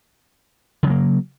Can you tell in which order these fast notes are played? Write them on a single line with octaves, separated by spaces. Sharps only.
C#3 F#3 A#3